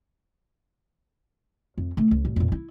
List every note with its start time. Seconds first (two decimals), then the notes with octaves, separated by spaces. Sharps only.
1.78 F2
1.97 D3 A3
2.11 C#2
2.25 A1
2.36 F2 A#2
2.52 E4